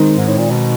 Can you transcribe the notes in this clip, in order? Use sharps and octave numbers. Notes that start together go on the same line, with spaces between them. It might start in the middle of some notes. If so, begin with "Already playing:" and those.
Already playing: D#3 G#3 C4 D#4
G#2
A2
A#2
B2